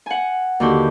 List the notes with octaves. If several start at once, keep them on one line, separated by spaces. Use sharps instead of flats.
F#5 G#5
D#2 D3 F#4 G4